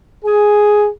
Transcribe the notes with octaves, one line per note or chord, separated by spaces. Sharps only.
G#4